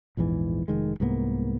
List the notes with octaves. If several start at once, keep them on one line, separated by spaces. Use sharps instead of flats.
A#1 E2 G#2 E3
F1 D#3 G#3
C2 G#2 A#3 B3